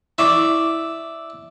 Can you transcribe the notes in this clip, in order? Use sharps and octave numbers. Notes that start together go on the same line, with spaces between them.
E4 D5 E5 C#6 D6